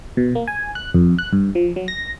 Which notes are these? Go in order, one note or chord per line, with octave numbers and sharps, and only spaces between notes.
B2
A#3
G#5
F#6
F2
F#6
G2
F3
F#3
A#6